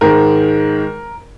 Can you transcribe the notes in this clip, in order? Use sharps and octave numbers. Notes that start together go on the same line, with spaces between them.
G#2 D#3 G#3 A#4